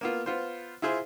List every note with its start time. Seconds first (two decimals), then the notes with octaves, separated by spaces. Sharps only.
0.01 A#3 B3 F4
0.26 B3 F4 C5
0.82 E4 F4 G#4 C5